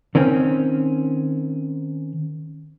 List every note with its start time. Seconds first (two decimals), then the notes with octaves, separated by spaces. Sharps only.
0.15 D#3 C4 C#4